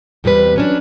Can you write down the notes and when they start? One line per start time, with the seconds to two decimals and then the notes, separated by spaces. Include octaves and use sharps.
0.24 E2 C3 G3 G4 B4
0.56 F#3 C#4 D4